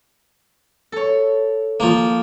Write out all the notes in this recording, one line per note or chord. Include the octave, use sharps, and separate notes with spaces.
A4 C#5
F3 A#3